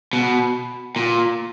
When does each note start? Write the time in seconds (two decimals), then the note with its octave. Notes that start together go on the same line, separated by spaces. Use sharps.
0.13 B2
0.96 A#2